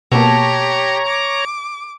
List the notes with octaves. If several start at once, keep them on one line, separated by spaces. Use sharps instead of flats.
B2 A#3 G4 A4 C#5 A#5
D6